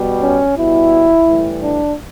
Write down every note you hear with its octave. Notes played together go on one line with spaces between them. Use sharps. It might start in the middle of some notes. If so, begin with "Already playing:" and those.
Already playing: B2 G3
C#4
B2 G3 E4
A2 E3 G3
D4